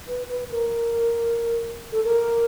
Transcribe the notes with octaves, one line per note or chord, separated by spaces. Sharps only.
B4
B4
A#4
A4
A#4